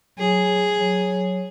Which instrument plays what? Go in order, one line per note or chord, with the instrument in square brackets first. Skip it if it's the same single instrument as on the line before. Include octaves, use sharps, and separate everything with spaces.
[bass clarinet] F#3 [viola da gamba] G#4
[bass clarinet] F#3